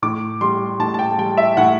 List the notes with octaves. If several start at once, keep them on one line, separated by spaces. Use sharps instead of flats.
A2 D6
G3 C6
A2 A5
A5
G5
G3 G5
E5
A2 F#5